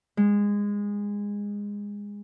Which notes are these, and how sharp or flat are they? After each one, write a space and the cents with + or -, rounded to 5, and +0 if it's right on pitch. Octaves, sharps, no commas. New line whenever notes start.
G#3 -20